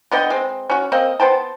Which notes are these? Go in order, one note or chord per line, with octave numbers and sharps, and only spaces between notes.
D3 B3 D#5 G5
G#3 C4
C#4 F#4
A#3 C4 D#5
B3 C5 G5 A5